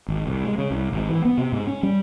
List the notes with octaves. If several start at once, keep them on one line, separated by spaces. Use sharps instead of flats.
G#1
C2
G#3
C#3
C2
G#1
E3
B3
C3
G#2
C#4
G3